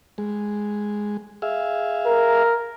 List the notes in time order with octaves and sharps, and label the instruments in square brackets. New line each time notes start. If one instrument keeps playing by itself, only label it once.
[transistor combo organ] G#3
G#4 E5 F5
[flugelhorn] A#4